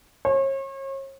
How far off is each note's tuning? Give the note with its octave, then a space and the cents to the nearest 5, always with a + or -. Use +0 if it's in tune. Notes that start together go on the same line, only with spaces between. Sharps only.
C#5 -40